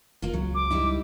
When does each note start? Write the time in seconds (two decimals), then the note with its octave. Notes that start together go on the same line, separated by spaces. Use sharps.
0.22 F1 A#3 F4
0.34 C#2 F#3
0.55 D6
0.70 G3 D#4 E4